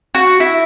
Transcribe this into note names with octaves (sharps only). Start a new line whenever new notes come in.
F#4
E4